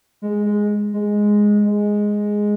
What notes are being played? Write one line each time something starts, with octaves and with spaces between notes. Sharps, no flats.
G#3
G#3
G#3
G#3